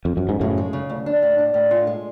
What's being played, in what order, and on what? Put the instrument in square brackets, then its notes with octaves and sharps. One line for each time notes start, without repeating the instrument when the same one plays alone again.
[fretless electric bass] F2
F#2
G#2
[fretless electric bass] F#2 A2 [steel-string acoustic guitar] C#3
[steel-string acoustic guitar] G#3
C#3
D2
D4
A2
D4
A2
F4
G#3